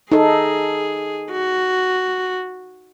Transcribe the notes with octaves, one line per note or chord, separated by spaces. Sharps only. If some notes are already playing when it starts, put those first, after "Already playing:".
D#4 G#4 A4
F#4